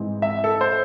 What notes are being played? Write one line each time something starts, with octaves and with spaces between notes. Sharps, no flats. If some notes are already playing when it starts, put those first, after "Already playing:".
Already playing: G#2 E3 G#3 C4
E5
A4
C5